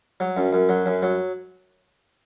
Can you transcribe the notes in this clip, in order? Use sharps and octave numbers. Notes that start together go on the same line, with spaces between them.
F#3
F#2
F#2
F#3
F#2
F#3